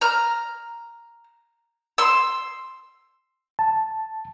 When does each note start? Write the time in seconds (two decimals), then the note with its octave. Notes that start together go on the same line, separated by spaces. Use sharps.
0.01 A#5 F6
1.98 C6 E6
3.59 A5